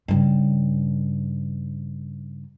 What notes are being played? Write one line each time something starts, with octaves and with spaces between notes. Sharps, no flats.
G2 C#3